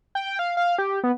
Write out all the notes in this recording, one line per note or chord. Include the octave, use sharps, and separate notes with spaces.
G5
F5
F5
G4
B3